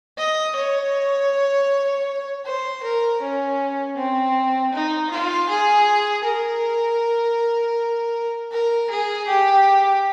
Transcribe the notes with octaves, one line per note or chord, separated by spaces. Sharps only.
D#5
C#5
C5
A#4
C#4
C4
D#4
F4
G#4
A#4
A#4
G#4
G4